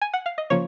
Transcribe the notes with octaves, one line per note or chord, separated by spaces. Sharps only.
G#5
F#5
F5
D#5
C#3 F3 A#3 C#5